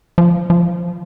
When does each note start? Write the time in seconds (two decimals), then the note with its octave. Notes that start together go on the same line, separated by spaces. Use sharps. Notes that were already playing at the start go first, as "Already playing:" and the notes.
0.18 F3
0.50 F3